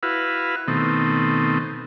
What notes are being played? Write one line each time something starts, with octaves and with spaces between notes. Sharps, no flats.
E4 F#4 B4 F5
B2 D#3 A3 C4